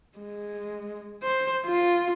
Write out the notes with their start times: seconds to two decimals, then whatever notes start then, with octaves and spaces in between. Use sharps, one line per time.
0.18 G#3
1.23 C5
1.66 F4